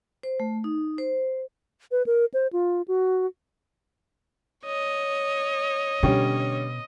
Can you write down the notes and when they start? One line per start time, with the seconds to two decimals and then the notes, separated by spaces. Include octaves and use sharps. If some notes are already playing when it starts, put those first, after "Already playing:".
0.23 C5
0.40 A3
0.64 D#4
0.98 C5
1.91 B4
2.06 A#4
2.34 C5
2.53 F4
2.88 F#4
4.65 C#5 D#5
6.03 B2 D3 G3 C#4